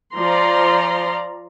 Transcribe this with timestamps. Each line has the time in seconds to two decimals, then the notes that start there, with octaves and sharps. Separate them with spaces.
0.14 F3 D5 A#5 C6